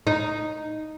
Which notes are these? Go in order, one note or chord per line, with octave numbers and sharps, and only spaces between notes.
D#4